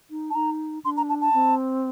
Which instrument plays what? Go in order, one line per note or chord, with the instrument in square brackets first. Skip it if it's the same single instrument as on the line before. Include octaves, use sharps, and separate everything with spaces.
[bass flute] D#4
[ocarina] A5
[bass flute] D#4 [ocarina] A#5
[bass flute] D4 [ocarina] C6
[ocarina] A#5
A5
A5
[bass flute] C4